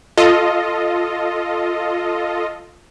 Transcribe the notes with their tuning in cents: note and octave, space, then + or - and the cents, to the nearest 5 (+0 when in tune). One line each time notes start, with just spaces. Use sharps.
F4 +0 A4 +0 D#5 +0